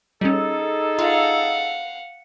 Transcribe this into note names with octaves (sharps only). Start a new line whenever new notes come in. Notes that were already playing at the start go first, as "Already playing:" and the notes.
G3 C#4 D#4 G#4 A4
F4 F5 F#5